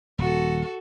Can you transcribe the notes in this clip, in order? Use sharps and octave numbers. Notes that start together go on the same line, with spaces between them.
D#1 F#4 A4